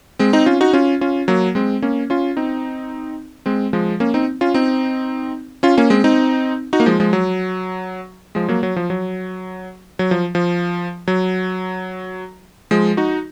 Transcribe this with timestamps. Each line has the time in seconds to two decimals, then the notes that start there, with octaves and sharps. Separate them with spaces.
0.19 G#3 C4
0.33 C4 D#4
0.46 C#4 F4
0.61 D#4 F#4
0.73 C#4 F4
1.01 C#4 F4
1.28 F#3 A#3
1.55 G#3 C4
1.82 A#3 C#4
2.10 C#4 F4
2.37 C4 D#4
3.46 G#3 C4
3.73 F3 G#3
4.00 A#3 C#4
4.14 C4 D#4
4.41 C#4 F4
4.54 C4 D#4
5.63 C#4 F4
5.77 A#3 C#4
5.90 G#3 C4
6.04 C4 D#4
6.73 D#4 F#4
6.80 A#3
6.86 F3 G#3
7.00 F3 G#3
7.13 F#3
8.35 F3 G#3
8.49 F#3 A#3
8.63 F#3
8.76 F3
8.90 F#3
9.99 F#3
10.11 F3
10.35 F3
11.08 F#3
12.71 F3 G#3
12.97 D#4 F#4